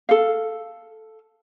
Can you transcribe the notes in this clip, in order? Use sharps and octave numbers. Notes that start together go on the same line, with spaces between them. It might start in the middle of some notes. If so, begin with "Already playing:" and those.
A4 F5